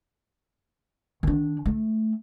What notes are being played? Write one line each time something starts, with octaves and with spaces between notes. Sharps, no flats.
D#3 D4
A3